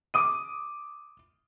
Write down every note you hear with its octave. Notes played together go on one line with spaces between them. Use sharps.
D6 D#6 D#7